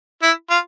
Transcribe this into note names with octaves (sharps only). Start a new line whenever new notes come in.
E4
F4